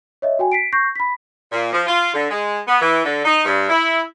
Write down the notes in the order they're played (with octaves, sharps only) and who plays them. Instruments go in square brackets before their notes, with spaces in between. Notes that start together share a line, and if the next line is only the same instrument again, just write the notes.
[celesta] C#5 D#5 E5
F#4 G5 G#5
B6 C7 D7
C#6 G6 A#6 C7
B5 B6
[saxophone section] A#2
F3
F4
D3
G#3
B3
E3
D3
D#4
G2
E4